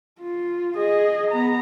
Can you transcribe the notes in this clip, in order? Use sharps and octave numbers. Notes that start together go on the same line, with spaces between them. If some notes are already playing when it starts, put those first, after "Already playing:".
F4
G#4 D#5
B3 A#5